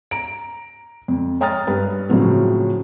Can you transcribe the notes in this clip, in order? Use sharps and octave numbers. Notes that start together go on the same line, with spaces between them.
A#5 D7
F2
C#5 G5 A#5 D#6 F6 A6
G2 B4
A2 C#3 F3 F#3 C4